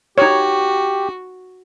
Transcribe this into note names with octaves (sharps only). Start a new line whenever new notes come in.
D#4 F#4 G4 C#5